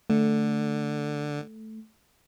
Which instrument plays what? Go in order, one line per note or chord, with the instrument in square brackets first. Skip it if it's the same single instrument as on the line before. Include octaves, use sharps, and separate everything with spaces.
[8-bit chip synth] D3 [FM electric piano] A3